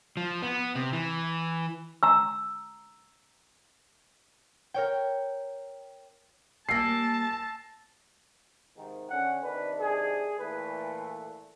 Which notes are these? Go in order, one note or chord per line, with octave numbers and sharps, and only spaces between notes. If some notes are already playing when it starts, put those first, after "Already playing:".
F3
B3
C3
E3
A#5 E6
A#4 C#5 G5
G3 A#3 G#5 A5 E6 A#6 C7
G#2 C3 D#3
D3 C#4 F#5
C3 D#3 D4 B4
G#4
A#2 E3 A3 B4